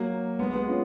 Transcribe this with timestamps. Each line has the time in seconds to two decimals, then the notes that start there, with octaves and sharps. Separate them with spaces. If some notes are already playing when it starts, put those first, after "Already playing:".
Already playing: F#3 A#3
0.39 G#3 B3
0.53 G#3 B3
0.68 C#4 F4